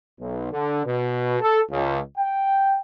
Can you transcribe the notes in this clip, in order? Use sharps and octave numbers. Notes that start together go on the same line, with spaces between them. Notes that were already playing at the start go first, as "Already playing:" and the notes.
B1
D3
B2
A4
C#2
G5